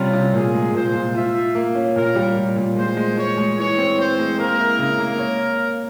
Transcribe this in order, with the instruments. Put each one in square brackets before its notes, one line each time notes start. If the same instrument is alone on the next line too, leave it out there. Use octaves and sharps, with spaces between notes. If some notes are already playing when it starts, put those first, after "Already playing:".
Already playing: [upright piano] C3 G3 C#4 [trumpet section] F4
[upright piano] C3
[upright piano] A#2 [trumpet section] G#4
[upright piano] G#3
[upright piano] A#2 [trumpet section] C5
[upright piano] A#2
[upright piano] F4 [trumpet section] E5
[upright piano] F4
A#3
C#4
[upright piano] A#2 [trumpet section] A#4
[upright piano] G3
A#2
A#2
[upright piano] G#3 [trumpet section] C5
[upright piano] G#3
[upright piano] G#3 [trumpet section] C#5
[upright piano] G#3
[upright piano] E3 [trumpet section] C#5
[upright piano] C4
[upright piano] C4 [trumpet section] C5
[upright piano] G#3
[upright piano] A#3 [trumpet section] A#4
[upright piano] E4
C#3
A#3
C#5